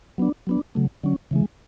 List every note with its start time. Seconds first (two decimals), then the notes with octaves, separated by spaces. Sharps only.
0.18 F#3 B3 D4
0.47 F#3 B3 D4
0.75 C#3 F#3 A3
1.03 D3 F#3 C#4
1.31 C#3 E3 G#3